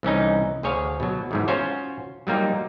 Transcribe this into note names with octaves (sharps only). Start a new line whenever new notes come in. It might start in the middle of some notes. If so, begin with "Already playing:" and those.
C2 E3 C#4 D#4
D2 G#4 C#5 F5
B2 F#3
E2 G#2 E3
C#4 F4 F#4 C5 C#5
F#3 G3 A#3 D#4 F4